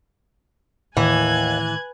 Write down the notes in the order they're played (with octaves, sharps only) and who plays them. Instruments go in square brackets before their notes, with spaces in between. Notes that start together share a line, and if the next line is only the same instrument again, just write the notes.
[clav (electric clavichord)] D#2 [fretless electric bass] A2 D#3 [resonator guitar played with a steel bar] E3 [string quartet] G#5 F#6 G#6